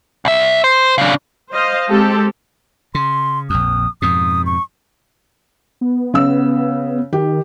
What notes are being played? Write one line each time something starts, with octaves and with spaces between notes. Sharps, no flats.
C2 E5
C5
C#3 D4
C5 D#5 F5
G#3 C4 G4 A4
C#3 C6
A#1 F2 D#6
F2 G#2 B2 D#6
C#6
B3
C#3 E6
D#3 G4